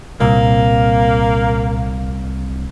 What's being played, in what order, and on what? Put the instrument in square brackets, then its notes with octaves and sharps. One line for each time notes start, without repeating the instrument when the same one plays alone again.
[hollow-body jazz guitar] C2 [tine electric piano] A#2 [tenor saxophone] A#3